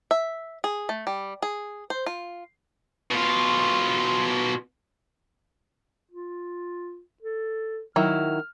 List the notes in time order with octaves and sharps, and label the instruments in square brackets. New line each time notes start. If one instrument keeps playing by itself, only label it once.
[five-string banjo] E5
G#4
A3
G3
G#4
C5
F4
[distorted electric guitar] B2 F4
[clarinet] F4
A4
[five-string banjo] D#3 F#3 E4 [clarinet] F6